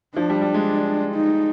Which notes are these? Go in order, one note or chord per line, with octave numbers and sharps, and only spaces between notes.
F3 D4
G3
G3
G#3
D#4